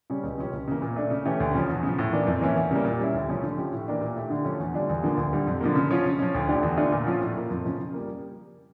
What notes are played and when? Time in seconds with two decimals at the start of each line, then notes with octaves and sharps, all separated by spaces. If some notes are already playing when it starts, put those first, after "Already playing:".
0.10 C#3 G3 C#4
0.24 C#2
0.38 C#3 F3 C#4 G4
0.53 C#2
0.68 C#3 E3 A#3
0.82 A#2
0.96 A3 D4
1.10 C#3
1.25 E3 A3 C#4 G4
1.40 D2
1.55 C#3 F3 C#4
1.70 E2
1.83 C#3 F3
1.99 A2
2.12 E3 A#3 D4
2.27 F2
2.41 E3 A#3 C#4 E4
2.56 E2
2.71 C#3 G3 A#3
2.85 A#2
2.99 G3 C#4 E4
3.14 D2
3.28 C#3 F3 A3 C#4
3.43 D3
3.57 F3 C#4 G4
3.72 A2
3.87 E3 A#3 D4 G4
4.01 A#2
4.16 A3 E4 G4
4.30 D3
4.45 F3 A3 C#4
4.60 E2
4.74 D3 G3 D4 F4
4.89 E2
5.03 D3 F3 A#3
5.17 D2
5.33 D3 G3
5.47 F2
5.61 D3 F3 A#3
5.75 C#3
5.91 F3 C#4 F4
6.05 C#3
6.19 F3 C#4
6.34 D2
6.49 D3 A3 D4 G4
6.63 E2
6.77 D3 A3 D4 F4
6.92 A#2
7.07 F3 C#4 F4
7.21 A2
7.36 F3 A#3
7.51 F2
7.65 C#3 F3
7.80 C#3
7.94 G3 A#3